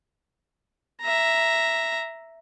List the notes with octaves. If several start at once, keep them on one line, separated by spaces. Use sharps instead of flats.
E5 A#5